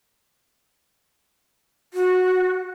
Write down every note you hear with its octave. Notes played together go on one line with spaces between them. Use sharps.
F#4